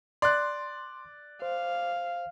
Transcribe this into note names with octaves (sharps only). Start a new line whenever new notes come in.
D5 C6 F#6
C5 F5